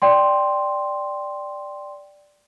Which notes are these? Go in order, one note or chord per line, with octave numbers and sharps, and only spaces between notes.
D5 G5 C6